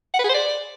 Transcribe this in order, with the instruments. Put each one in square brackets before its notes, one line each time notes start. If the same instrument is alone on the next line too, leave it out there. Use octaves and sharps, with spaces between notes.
[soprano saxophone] F#5
B4
G#4
C5
D5